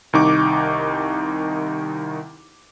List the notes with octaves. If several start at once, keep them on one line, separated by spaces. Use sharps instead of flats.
C2 D#3 D#4 C#6 D6